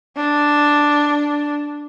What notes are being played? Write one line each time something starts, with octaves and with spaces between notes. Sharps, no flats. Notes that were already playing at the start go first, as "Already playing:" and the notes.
D4